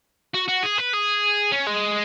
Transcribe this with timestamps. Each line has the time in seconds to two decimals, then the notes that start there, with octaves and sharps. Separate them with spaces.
0.34 F#4
0.48 F#4
0.63 G#4
0.78 B4
0.93 G#4
1.52 C#4
1.67 G#3